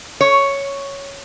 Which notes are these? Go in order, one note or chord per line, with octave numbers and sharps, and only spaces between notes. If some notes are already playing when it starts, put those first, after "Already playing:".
C#5